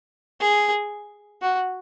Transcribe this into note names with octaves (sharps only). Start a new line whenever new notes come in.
G#4
F#4